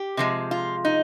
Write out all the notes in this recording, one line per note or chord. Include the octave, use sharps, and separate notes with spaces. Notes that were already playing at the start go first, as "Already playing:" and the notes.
Already playing: G4
C3 F3 G#3
F4
D#4